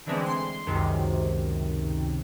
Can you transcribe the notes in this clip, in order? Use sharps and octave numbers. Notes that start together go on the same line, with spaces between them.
D3 E3 G#3 A3 C4
C6
C#2 F#2 C3 D#3